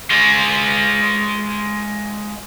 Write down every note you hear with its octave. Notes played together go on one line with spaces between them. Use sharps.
G#3 F4